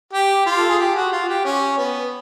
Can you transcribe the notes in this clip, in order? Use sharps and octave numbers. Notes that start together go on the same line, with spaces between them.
G4
F4
A4
G#4
G4
F#4
F4
G4
C#4
B3